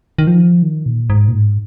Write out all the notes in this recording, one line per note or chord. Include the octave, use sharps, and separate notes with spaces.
D#3
F3
D#3
A#2
G#2
A#2
G#2